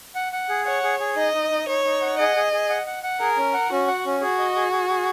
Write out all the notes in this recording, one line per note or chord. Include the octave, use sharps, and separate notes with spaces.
F#5
F#5
G#4
C#5 F#5
G#4
G#4
D#4 D#5
D#4
D#4
D#4 C#5
D#4
F#5
G#4 D#5
G#4
G#4
F#5
F#5
F#5
G#4 A#4
C#4
F#5
C#4 F#4
F#5
C#4
F#4 G#4
D#5
G#4
G#4
G#4